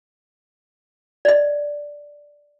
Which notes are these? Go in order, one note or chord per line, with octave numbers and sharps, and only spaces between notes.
D5 D#5